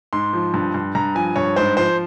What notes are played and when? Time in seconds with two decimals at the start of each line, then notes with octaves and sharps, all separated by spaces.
0.13 G#2 C6
0.33 F3
0.54 G2
0.74 G2
0.95 G2 A#5
1.15 F3 G#5
1.36 G2 C#5
1.56 G#2 C5
1.77 F3 C5